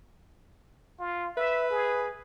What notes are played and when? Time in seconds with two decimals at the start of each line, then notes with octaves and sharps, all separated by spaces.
0.99 F4
1.37 B4 E5
1.70 G#4